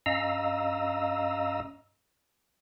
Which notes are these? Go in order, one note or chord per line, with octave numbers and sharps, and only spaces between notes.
G2 C#4 D#5 F5 A#5 E6